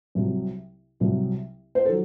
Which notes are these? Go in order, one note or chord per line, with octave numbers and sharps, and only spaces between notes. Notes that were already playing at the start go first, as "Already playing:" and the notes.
C2 C3 F#3
C2 C3 F#3
C5
D#3 F#3 A4